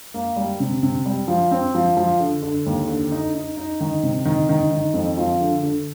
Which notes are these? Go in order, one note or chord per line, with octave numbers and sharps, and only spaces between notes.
A#3
G3
C3
C3
G3
F3
C4
F3
F3
D3
D3
D#2
D3
D#4
D#4
D#4
D#3
C3
D#3
D#3
D#3
F2
F3
D3
D3